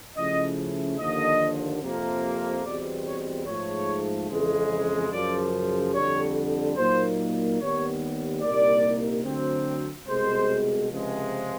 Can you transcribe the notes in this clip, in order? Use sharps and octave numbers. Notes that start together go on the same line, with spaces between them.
C#3 F3 A3 C#4 E4 D#5
D#2 D3 F3 D#5
F2 C3 F3 A#3
E2 B2 G3 C4 D5
C#5
G#2 F3 A3 C#5
F2 C#3 E3 G#3
F#2 C#3 F3 D5
F2 D3 G3 C#5
A#2 F#3 A#3 D#4 C5
D#2 D#3 G3 B3 C#5
C2 A#2 G3 A#3 D#4 D5
D2 D3 F#3 A3 C4
C2 B2 G#3 C5
C#2 C3 F3 G#3